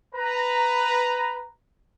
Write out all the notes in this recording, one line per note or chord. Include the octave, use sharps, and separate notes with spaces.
B4 A#5